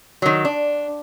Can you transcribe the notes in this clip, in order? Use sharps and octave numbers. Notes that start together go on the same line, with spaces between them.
D#3 F#3
D4